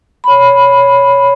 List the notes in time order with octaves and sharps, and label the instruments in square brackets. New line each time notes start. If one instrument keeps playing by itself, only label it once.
[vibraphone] C#5 B5